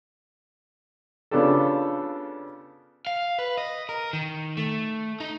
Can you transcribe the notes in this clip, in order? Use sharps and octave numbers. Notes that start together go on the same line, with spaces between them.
C#3 B3 D4 F4 G4 A4
F5
B4
D#5
A#4
D#3
A3
D#4